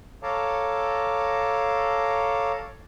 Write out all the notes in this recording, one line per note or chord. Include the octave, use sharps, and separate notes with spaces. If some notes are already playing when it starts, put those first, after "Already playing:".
A4 C#5 F5 A5 A#5 D6